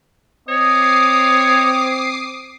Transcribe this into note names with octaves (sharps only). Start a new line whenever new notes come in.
C4 C#5 D#5 D6 D#6 C7